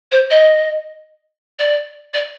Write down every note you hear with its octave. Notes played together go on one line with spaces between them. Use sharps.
C5
D#5
D5
D5